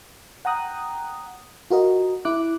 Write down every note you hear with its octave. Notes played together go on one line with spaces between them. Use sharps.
F#5 G5 A#5 D#6 F#6
F4 F#4 A#4 D#5
E4 D6 F#6